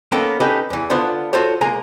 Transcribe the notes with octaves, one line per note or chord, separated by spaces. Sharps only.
A#3 B3 C#4 D#4 A4 G5
C#4 D#4 G4 A4 B4 D#5
E2 E3
D3 B3 D4 F4 C5
F4 F#4 A4 C5 C#5
B1 G#3 A#3 A#4 G#5 A#5